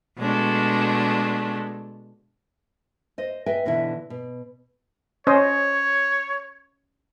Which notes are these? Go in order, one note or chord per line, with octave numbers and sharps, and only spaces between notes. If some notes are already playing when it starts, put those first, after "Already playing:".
B2 G#3 A3 D4
C5 D#5
B4 D#5 E5 G5 G#5
B2 D3 E3 D4 E4
B2
C#4 C5 C#5 D#5